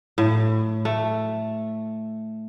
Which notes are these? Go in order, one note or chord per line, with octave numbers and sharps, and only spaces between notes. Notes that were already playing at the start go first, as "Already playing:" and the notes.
A2
A3